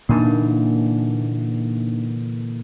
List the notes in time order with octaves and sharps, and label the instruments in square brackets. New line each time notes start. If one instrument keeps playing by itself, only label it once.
[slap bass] A#2 D3 E3 [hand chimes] A#3 D4 D#4